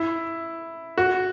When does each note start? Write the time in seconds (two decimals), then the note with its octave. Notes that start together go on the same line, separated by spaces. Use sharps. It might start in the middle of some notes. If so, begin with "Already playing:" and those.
Already playing: E4
0.98 F#4